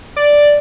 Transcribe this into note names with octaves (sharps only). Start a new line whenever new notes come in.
D5